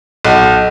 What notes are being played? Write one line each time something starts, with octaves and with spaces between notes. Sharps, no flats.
B1